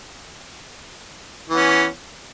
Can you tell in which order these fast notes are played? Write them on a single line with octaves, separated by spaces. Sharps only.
E3 B3 C#4